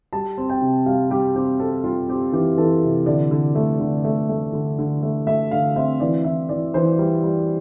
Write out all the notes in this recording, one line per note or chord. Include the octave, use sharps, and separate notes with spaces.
G3 A5
C4
G5
C3
G3 F5
G3 G4
C4 G4
C4 A4
G3 F4
C4 G4
E3 G4
E3 A4
C3
D3 D5
D3
A3
D3
A3
A3
D3
D3
A3
A3 E5
D3 F5
C4 E5
E3 D5
E3 E5
E3 D5
E3 C5
G3
G3